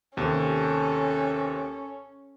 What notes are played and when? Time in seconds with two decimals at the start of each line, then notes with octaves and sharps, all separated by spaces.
0.17 D#2 C3 C#4 A4